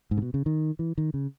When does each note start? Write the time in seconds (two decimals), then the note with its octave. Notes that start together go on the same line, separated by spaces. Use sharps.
0.11 G#2
0.17 C#3
0.22 B2
0.34 C#3
0.46 D#3
0.79 E3
0.98 D#3
1.14 C#3